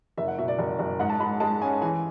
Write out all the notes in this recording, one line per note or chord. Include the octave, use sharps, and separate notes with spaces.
F#1 E5
F#5
B2 E5
D5
F#1
F#1
G#2 F#5
A5
G#3 B5
G#3 A5
C#4 G#5
E3 G#5